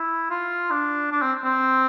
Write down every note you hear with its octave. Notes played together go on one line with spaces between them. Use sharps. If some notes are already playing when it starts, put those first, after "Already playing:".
Already playing: E4
F4
D4
D4
C4
C4